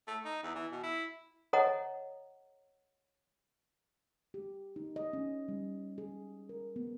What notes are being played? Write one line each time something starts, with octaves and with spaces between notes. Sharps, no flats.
A3
D#4
E2
E3
B2
E4
A4 C#5 D#5 F#5 A#5
G4
D#4
D#5
C#4
G3
G#4
A#4
B3